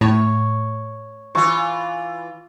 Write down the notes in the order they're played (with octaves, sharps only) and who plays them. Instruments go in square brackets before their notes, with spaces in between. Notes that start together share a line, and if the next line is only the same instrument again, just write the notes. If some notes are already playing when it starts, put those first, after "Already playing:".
[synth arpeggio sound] A2 [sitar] C#5
[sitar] E3 F4 [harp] C#6